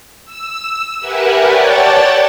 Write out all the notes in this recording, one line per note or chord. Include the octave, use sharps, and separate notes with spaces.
E6
G4 A#4 B4 E5 F#5 G#5
C#5 D5 F#5 G5 A5 A6